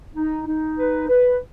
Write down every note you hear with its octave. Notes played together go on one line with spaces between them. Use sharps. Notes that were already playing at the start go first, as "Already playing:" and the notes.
D#4
D#4
B4
B4